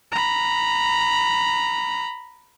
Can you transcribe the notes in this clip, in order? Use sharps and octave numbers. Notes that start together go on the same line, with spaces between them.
A#5 B5